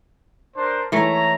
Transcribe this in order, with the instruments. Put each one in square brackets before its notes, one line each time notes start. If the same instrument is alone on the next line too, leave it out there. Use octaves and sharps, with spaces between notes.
[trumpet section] D4 A#4 C5
[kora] E3 A3 [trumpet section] C#5 E5 A#5